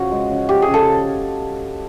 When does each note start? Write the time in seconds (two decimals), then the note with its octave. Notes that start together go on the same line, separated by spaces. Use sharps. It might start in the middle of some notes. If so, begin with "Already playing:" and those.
Already playing: C#3 F3 F#4
0.11 G#3
0.30 C#3
0.49 F3 G4
0.62 G#4
0.67 C#3
0.74 A4